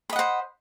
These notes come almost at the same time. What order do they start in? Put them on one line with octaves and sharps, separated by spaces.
B5 D#5 F#5 C5